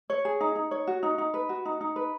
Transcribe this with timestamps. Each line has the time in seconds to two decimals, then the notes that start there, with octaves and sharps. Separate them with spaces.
0.10 C#5
0.25 G#4
0.40 D#4
0.56 D#4
0.71 C#5
0.87 F#4
1.03 D#4
1.18 D#4
1.34 B4
1.49 F#4
1.65 D#4
1.81 D#4
1.96 B4